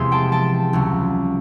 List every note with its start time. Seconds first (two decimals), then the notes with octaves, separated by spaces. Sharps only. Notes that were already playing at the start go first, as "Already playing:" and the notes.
Already playing: E2 C3 F3 G#3 C4 C6
0.12 G5 A5
0.32 G5 A5
0.73 C#2 C#3 F#3